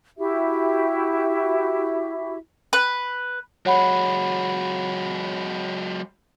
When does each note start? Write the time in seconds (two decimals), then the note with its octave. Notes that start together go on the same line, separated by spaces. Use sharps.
0.18 E4 F#4 G4 E5
2.73 B4
3.66 F#3 G#3 C#5 F#5 B5